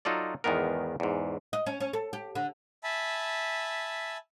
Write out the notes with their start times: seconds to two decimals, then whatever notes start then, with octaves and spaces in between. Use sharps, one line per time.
0.05 F#3 D#4 F4 A4 D5
0.44 E2 G#2 D#3 B3 A#4
1.00 E2 G#2
1.53 D#5
1.66 C#4
1.80 C#4
1.93 A4
2.13 G4
2.35 D3
2.84 E5 G#5 A5 B5